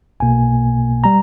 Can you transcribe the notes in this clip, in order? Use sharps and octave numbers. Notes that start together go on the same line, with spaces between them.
B1 B2 A#3 G#5
G3 A#5